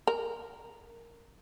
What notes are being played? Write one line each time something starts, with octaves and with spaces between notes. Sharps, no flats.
A#4